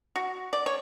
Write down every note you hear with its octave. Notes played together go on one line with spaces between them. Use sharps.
F#4
D5
C#5